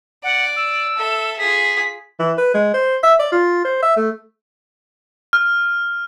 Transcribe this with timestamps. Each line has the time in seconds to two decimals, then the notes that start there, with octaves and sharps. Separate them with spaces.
0.24 D5 F#5
0.56 E6
0.96 A4 E5
1.39 F4 G#4 B6
2.19 E3
2.38 B4
2.54 G#3
2.74 C5
3.03 E5
3.19 D5
3.32 F4
3.65 C5
3.82 E5
3.96 A3
5.33 F6